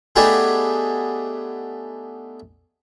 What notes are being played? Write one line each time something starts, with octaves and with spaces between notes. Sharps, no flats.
A3 B3 D4 D#4 G4 G#4